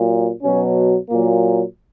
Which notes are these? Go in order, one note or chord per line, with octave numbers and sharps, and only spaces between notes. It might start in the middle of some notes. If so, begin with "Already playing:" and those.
Already playing: A#2 F#3
B2 F#3 C#4
A#2 F#3 A#3